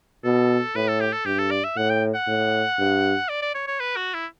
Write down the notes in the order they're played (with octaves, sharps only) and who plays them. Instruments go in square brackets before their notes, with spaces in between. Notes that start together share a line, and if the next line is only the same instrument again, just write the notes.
[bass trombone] B2 [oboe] A4
[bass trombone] A2 [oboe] B4
[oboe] A4
G4
A4
[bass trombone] G2 [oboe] G4
[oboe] A4
D5
E5
[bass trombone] A2 [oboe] F#5
[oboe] G5
F#5
[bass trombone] A2
G2
[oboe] D5
D5
C#5
C#5
B4
F#4
E4